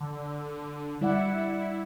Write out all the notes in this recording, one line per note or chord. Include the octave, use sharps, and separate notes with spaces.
D3
G3 E4 D5 F#5